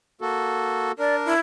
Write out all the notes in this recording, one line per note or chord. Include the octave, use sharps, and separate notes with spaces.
A#3 F#4 A4
D4 A#4 D5
E4